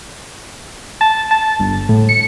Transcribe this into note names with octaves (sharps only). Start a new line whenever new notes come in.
A5
A5
G1
A2
C#7